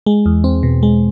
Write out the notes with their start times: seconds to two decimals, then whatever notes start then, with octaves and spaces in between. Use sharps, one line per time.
0.06 G#3
0.26 E2
0.44 C4
0.63 B2
0.83 G#3